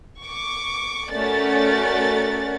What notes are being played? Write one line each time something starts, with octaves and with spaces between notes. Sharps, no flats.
C#6 D6
A3 C#4 F#4 A#4 D5 A6